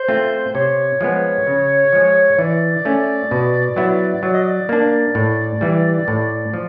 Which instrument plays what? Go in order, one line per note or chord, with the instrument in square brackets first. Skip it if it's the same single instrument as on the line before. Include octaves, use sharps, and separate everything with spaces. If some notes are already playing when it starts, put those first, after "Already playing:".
Already playing: [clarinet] C5
[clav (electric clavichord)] A3 C4 F4
[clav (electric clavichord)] C3 [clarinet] C#5
[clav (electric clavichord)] F3 G#3 B3
C#3
F3 G#3
[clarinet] C#5
[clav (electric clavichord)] E3 [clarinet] D5
[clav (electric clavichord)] A3 C#4
B2
F#3 B3 E4
[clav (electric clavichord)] F#3 [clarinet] D5
[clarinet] D#5
D5
[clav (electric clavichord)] A#3 D4
A2
E3 G3
A2
F3